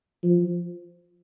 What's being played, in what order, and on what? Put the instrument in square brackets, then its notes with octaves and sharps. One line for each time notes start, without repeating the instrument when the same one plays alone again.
[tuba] F3